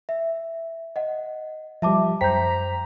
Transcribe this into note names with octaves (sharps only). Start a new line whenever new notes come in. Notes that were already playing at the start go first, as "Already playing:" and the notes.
E5
D#5 F#5
F3 G3 E5 A5 D6
F#2 C5 G5 A#5 G6 B6